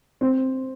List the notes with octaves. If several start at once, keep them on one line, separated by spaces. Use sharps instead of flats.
C4